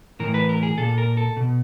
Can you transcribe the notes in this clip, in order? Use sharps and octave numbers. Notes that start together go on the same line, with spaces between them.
A2 E3 A#4
B4
A#4
G#4
A#2 A4
A#4
A4
B2